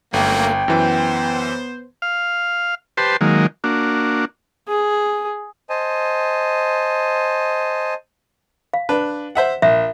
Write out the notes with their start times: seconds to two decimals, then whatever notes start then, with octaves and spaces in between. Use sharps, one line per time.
0.14 G1 F#2 A3 A#3 G5
0.68 F#2 E3 B3 C5
2.02 F5
2.97 G4 B4 C5 A5 C6
3.21 D#3 F#3 G#3 A#3
3.64 A#3 D4 F#4
4.68 G#4
5.70 C5 D#5 G#5 A5
8.74 F5
8.89 D4 B4
9.35 C5 E5 F#5
9.62 A#1 E5